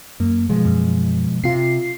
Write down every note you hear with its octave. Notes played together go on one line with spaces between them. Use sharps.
F#2 A#3
B2 F3 G#3
F#2
C3 F4 C7